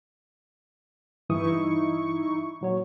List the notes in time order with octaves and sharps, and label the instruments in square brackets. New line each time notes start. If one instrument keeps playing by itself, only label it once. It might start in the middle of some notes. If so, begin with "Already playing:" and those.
[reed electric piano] G2 E3 D#6 [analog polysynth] D#4 E4 C#6
[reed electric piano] A#2 F#3 C#5